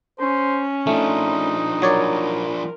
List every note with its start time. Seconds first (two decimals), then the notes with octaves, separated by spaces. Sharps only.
0.20 C#4 C5
0.87 F3 A3 D4 D#4
1.82 F#3 A#4 C#5 D5